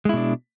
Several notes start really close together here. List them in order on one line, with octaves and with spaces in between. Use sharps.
G#3 E4 B2 D4